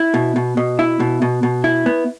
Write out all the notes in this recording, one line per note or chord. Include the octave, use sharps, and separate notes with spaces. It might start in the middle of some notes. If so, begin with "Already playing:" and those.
Already playing: E4
B2
B2
B2
E4
B2
B2
B2
E4
B3